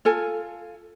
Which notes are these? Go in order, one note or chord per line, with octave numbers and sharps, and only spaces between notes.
F4 A4 G#5